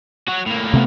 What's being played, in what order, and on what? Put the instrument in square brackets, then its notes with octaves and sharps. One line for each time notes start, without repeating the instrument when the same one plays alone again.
[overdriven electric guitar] F#3 F#4
A2 A#3
[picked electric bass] C3 A3 B3